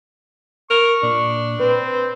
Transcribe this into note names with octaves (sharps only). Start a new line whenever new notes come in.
A#4 C#6
A#2 D4
C4 B4